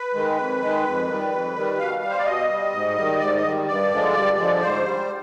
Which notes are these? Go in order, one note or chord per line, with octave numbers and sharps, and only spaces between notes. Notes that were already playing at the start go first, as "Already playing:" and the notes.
Already playing: B4
D#3 G#3
F2
D#3 G#3
F2
D#3 G3
F2
D#3 G3
B2 F5
G3
C5
D5
B2 D#5
G3
G#2
D#3 G3
G#2 D5
D#5
D#3 G3
G2 D5
D3 F3 G#3
G2
D3 F3 G#3
G#2 C5
G3